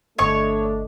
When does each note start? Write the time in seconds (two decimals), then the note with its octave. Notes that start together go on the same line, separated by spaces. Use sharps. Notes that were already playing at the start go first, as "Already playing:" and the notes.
0.18 G1 A3 D4 C#5 D#5 C#6